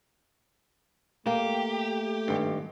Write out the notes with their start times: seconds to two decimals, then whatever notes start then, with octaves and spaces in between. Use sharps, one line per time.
1.26 A3 A#3 G4
2.28 G#1 G2